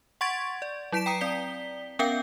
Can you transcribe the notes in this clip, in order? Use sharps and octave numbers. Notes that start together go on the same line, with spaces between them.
F#5 C6 C#6 G#6 A6 D7
D5
F#3 E4 A5 B6 D7 E7
G5 A#5 D#6 C7 C#7
C4 D5 B6 G7
B3 C#4 A#4 F5 G5 G6